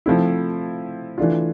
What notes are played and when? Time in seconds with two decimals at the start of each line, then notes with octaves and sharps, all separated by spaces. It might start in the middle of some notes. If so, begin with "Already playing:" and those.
0.06 F3 A3 C4 E4
1.18 E3 A3 D4 F4